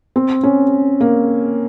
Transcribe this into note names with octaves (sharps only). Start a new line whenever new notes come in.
C4
C#4
A#3